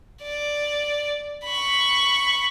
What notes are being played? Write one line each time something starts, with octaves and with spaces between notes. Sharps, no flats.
D5
B5 C#6